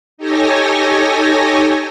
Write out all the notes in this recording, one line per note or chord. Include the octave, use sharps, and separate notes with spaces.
D#4 G4 A4 C#5 G#5 A#6